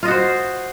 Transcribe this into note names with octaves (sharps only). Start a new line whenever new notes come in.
F4 F#4 C5 D#5